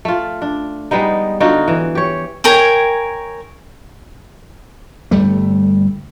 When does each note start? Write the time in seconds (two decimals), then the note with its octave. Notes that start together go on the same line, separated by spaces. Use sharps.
0.05 A3 F4
0.42 D4
0.91 G3 G#3 B3 D#4
1.40 D3 D#4 F4 F#4
1.68 E3
1.95 G4 C#5
2.44 A#4 C#5 G5 G#5
5.11 G1 G3 A3